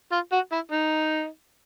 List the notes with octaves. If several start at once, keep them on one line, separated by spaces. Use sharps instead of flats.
F4
F#4
E4
D#4